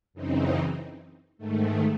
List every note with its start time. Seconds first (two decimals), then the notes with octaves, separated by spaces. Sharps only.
0.14 F#2 C#3 E3 C4 D#4
1.38 G#2 D#3 A3